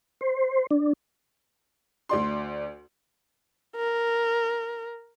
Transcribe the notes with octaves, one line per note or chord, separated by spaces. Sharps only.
C5
D4
D2 D5 C6
A#4